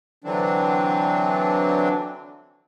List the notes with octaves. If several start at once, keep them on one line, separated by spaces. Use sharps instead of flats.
D3 E3 F#3 C4 D4